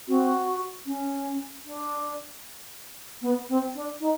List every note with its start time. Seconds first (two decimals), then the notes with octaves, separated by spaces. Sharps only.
0.08 C4 F#4
0.87 C#4
1.65 D4
3.21 B3
3.48 C4
3.74 D4
4.00 D#4